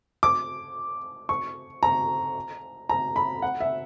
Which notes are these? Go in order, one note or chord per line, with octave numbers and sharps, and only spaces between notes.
D6
C#6
A#5
A#5
B5
F#5
E5